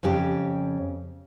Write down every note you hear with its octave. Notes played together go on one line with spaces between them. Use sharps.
F2 C#3 C#4 G4 G5